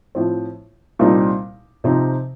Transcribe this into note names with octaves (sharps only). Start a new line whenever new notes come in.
A2 F3 C4
C2 A#2 G3 C4 D#4
C3 F3 C4 D#4